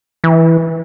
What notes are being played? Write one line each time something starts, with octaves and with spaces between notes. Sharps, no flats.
E3